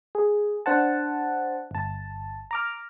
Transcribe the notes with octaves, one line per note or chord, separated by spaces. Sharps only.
G#4
D4 C5 F#5 A5
G1 A5
A#5 D6 F6